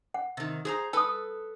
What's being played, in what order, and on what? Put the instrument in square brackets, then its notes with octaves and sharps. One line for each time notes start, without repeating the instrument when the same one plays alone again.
[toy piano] F#5
[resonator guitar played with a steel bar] C3 D#3
G#4 C5 A#5
[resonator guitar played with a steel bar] A4 B4 [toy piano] A5 D#6